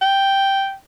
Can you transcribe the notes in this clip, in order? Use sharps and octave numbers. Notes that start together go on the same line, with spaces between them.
G5